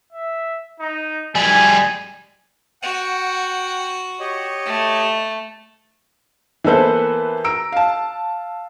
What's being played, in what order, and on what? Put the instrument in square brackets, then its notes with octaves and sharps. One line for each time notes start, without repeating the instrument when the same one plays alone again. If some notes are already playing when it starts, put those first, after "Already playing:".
[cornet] E5
D#4
[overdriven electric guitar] G3 G#4 [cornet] G#5
[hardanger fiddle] F#4 [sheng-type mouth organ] F#5 G5
[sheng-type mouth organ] G4 C#5 D#5
[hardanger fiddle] A3
[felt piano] E3 A#3 B3 A4 B4 C5
A#5 E6 D7
F5 A5